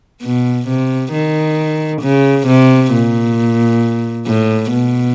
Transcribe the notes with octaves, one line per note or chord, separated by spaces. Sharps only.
B2
C3
D#3
C#3
C3
A#2
A2
B2